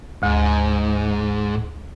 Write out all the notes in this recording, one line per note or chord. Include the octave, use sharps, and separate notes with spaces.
D2 G#2